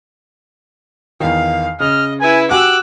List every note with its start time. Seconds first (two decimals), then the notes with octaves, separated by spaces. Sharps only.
1.20 E2 D#3 F5
1.80 C#3 D#5 F6
2.21 E4 B4 G#5
2.51 F#4 G4 G#5 D6 E6 F#6